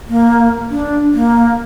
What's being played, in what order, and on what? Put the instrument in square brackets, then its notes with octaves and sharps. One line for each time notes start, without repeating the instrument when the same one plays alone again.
[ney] A#3
D4
A#3